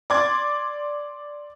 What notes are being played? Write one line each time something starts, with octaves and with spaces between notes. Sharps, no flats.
D5 C6 D6 G#6 A6